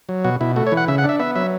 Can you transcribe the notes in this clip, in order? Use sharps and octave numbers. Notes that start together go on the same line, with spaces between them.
F#3
B2 F#4
B2 E4
A3 F#4
C#5
E3
F#5
C#3 E5
F#5
D4
E5
B3 E5
F#3 E5